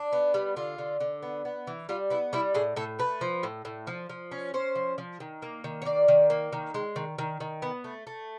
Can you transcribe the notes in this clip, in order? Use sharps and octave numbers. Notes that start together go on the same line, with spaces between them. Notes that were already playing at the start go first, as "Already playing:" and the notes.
Already playing: D4
B3
G3
D3 F4
D3
D3
B3
B3
E3
G3 F4
B3 E4
G3 E4
A2 G#4
A2 A4
A3 B4
F3
A2
A2
F3
F3
C#4
C#4 C5
F3
F3
D#3
A#3
D#3
C#5
A#3 D5
D#3
A#3
D#3
G#3
D#3
D#3
D#3
B3
A3
A3